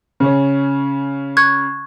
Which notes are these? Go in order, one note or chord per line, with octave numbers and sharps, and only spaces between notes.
C#3 C#4
C#6 F#6 G#6